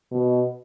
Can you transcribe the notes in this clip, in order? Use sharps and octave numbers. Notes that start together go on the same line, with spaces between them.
B2